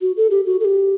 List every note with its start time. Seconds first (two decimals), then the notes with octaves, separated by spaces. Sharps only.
0.02 F#4
0.17 A4
0.31 G4
0.46 F#4
0.60 A4
0.65 G4